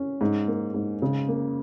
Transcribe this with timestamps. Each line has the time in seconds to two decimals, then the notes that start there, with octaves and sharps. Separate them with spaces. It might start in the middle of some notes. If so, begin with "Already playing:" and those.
Already playing: C#4
0.21 G#2
0.48 A#3
0.74 G#2
1.02 C#3
1.28 A#3